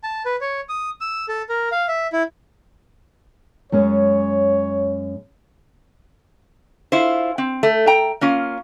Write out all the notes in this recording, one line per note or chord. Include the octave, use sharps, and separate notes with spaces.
A5
B4
C#5
D#6
E6
A4
A#4
F5
E5
E4
F#2 G#3 C#4 C#5
E4 F4 C5
C4
A3
G5 A#5
A#3 C#4 F4